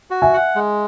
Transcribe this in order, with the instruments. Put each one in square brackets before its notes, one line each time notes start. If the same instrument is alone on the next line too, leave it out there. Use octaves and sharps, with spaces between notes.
[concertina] F#4
[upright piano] E5 G#5
[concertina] F#5
G#3